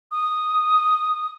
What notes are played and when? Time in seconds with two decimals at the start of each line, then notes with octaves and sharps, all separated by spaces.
0.11 D#6